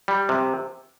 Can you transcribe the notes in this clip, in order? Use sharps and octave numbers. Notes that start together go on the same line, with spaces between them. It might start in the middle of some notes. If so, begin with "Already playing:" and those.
G3
C3